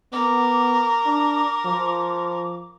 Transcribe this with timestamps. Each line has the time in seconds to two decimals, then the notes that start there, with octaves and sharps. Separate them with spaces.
0.13 B3 A#4 D6
1.06 D4
1.65 F3